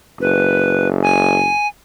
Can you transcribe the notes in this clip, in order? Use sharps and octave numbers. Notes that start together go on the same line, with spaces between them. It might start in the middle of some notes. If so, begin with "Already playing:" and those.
F#1 B4
G#5